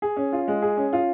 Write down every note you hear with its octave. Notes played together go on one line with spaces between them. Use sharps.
G#4
C#4
F4
G#3
G#4
C#4
F4